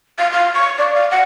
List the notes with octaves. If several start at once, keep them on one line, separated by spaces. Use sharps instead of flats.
F5
F5
C#6
D5
F5
F#5